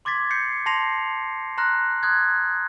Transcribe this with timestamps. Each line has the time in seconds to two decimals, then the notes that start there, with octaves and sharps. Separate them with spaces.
0.05 C6 D6 G#6 A6 B6
0.31 G6 C7 C#7
0.66 A5 C6 A#6 C7 F7
1.58 A#5 C6 F6 F#6 A#6
2.03 C6 D#6 F#6 G#6